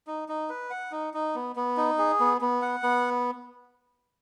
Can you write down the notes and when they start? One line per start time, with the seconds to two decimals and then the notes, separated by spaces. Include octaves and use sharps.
0.07 D#4
0.29 D#4
0.49 B4
0.70 F#5
0.92 D#4
1.14 D#4
1.35 B3
1.56 B3
1.77 D#4
1.98 G#4
2.20 B3
2.41 B3
2.62 F#5
2.83 B3